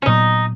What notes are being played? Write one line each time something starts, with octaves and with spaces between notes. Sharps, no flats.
C#4
A#2 F#3 B3 D#4